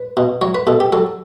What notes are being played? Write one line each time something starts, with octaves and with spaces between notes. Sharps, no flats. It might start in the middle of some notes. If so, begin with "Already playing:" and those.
Already playing: B4
B2
F#3 C#5
B4
B2 A4
G4
F#3 A4